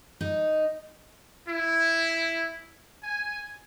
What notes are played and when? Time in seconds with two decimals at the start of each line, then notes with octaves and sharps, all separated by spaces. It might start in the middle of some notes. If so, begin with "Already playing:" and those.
0.21 D#4
1.49 E4
3.04 G#5